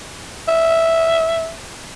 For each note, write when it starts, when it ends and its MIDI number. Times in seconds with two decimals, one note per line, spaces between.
0.48 1.52 76